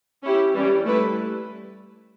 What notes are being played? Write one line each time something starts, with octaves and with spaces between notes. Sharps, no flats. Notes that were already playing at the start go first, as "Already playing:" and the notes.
C#4 E4 G4
E3 G3 C#4
A3 E4 B4